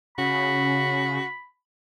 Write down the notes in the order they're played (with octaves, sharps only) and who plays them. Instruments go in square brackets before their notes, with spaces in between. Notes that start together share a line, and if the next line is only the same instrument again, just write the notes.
[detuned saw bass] C#3 [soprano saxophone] F#4 [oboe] B5